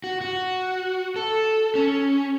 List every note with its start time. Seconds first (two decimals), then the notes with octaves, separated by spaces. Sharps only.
0.04 F#4
0.21 F#4
1.16 A4
1.75 C#4